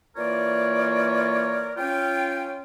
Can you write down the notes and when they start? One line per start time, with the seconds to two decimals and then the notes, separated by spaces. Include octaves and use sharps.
0.16 E3 A#3 F4 A#4 C#5 D5
1.77 C#4 F4 G5